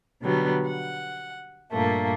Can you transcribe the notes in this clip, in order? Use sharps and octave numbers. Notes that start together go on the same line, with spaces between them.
B2 D3 F#3 G3 B3
F#5
G2 A#2 A3 A#3